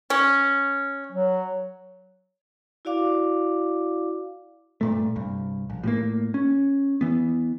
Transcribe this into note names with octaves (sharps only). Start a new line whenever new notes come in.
C#4
F#3
E4 F#4 D5 F5 D6
G2 A#2 A3
C2 G2
A#1
A2 F3 A#3
C#4
E3 B3